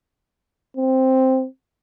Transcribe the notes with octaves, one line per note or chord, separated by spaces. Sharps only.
C4